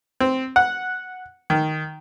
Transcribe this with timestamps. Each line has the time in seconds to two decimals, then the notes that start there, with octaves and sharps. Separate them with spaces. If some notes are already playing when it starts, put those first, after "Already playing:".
0.20 C4
0.56 F#5
1.50 D#3